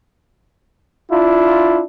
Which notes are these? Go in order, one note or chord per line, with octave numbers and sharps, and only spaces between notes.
D4 E4 F4